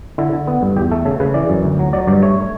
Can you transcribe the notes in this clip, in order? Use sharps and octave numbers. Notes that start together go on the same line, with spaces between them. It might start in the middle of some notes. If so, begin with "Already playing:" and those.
D3 E4
D3
B3
G2
E2 G4
A3 A4
C#3 A4
C#3 B4
E3 D5
F#2
D2
F#3
F#3 D5
G2 D5
A3 C#5